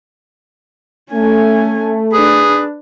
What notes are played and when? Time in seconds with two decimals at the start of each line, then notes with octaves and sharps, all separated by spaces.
1.12 A3 C#4 G#5
2.13 D4 G#4 B4